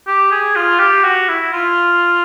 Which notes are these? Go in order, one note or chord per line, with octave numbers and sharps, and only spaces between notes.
G4
G#4
F4
G4
F#4
E4
F4